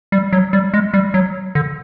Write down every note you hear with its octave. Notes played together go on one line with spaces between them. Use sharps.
G3
F#3
G3
G#3
G3
F#3
D3